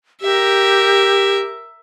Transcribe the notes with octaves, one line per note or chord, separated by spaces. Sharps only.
G4 A#4 E5